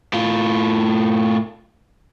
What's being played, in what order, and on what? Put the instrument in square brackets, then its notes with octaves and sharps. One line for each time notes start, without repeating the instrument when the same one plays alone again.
[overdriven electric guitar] A2 F4